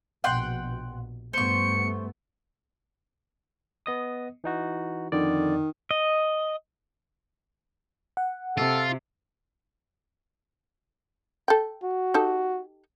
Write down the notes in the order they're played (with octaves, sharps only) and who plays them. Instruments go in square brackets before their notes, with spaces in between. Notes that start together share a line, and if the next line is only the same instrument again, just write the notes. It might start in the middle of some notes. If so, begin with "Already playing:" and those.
[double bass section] A#1 B2 [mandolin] F#5 G5 C6
[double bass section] G2 A3 B3 [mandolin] C5 C#6 [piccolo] C#7
[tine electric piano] B3 D#5 D#6
E3 D#4 F#4
[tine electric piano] F2 D3 D5 [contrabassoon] D#3
[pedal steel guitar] D#5
[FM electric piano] F#5
[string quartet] C3 [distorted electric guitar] F4 [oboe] A4
[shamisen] A4 G5
[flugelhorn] F#4
[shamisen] D#4 G4 A4